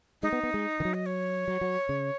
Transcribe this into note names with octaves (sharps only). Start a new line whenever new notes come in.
G#3 D#4
B3
B3
G#3
D#3
F#3
D#5
C#5
F#3
F#3
C#3